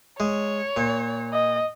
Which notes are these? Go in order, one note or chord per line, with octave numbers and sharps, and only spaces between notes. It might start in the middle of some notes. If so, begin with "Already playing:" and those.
G#3 C#5
A#2
D#5